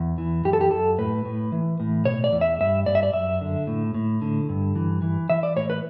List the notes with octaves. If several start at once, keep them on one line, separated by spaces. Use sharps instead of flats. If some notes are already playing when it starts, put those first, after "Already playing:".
Already playing: E2
E3
F#2 G4
A4
G4
F#2 A4
A2 B4
A2
E3
A2
B2 C#5
D5
E2
E5
G2 E5
G2 D5
E5
D5
F#2 E5
D3
A2
A2
D3
G2
E3
E3
E3 E5
D5
A2 C#5
B4